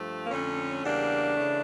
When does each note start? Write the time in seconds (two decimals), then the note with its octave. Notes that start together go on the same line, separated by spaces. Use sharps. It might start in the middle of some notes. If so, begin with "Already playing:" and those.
Already playing: G2 F3 A3
0.24 A#3
0.31 F2 D3 A3 C#4
0.84 E2 C#3 G3 A#3 D4
1.37 C#3 E3 A3